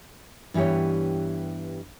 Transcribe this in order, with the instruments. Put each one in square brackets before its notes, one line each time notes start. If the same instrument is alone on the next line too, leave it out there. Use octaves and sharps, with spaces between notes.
[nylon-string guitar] G2 E3 B3 G4 C#5